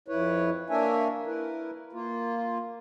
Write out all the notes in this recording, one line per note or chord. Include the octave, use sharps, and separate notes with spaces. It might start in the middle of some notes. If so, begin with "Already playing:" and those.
F2 E4 B4 C#5
A#3 D4 A#4 C#5 E5 G#5
E4 A#4 B4
A#3 F4